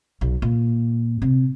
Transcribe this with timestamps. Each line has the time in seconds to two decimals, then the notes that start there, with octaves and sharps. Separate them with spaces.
0.21 B1
0.42 A#2
1.22 C3